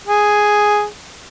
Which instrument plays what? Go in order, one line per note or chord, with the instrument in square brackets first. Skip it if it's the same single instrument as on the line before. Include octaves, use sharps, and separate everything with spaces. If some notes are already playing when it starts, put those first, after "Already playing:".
[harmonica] G#4